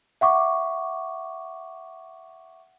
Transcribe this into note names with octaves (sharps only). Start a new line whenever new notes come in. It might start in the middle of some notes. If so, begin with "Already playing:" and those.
E5 F#5 C#6 D6